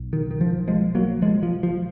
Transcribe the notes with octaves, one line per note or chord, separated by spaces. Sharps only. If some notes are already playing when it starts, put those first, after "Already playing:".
Already playing: B1
D#3
D#3
F3
F3 G#3
F#3 A#3
F3 G#3
F3
F3